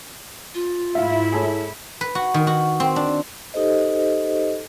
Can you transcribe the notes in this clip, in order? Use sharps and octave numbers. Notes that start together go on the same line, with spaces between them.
F4
G#2 E4 E5 F5
G#4 A4 C#5
B4
F#4
D#3
F#4
C4
D4
D#4 G4 A4 C5 D#5